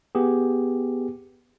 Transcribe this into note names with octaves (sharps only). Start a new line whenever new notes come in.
B3 G4 G#4